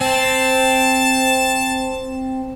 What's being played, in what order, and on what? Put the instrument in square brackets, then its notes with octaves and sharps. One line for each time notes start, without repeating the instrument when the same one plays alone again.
[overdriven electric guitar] C4 [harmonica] A5